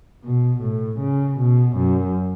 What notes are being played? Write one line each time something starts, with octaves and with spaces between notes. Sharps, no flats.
B2
A2
C#3
B2
F#2